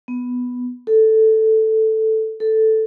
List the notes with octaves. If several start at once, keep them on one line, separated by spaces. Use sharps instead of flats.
B3
A4
A4